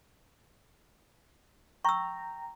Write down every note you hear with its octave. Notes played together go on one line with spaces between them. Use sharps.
G5 A#5 C#6 E6